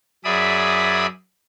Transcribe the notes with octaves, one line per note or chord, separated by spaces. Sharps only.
F#2 G#4 D5 E5 B5 D#6